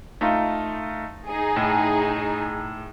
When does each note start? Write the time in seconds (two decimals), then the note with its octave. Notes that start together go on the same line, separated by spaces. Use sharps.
0.21 A3 D#4 F4
1.25 D#4 G#4
1.56 A2